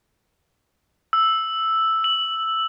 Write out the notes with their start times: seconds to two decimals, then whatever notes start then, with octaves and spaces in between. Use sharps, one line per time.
1.13 E6
2.04 F#7